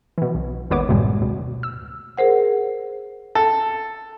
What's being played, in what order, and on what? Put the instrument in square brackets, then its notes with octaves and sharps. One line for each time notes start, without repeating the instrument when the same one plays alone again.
[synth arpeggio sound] B2 E3
B1
G#1 D#2 B3 C#5 D6
F#2 A2 C3 D#3 G3 G#3
D2 B2
E6
[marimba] G#4 A#4 C5 F#5
[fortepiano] A4